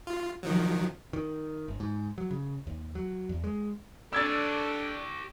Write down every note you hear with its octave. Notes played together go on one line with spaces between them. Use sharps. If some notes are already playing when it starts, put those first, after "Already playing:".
F4
D#3 F3 F#3
D#3
G1
G#2
F#3
C#3
D#2
F#3
E2
G#3
D4 G4 A4 C#5 E6 G#6 A6